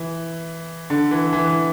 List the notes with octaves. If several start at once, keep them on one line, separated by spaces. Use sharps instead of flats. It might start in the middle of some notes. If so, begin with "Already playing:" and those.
Already playing: E3
D3
E3
E3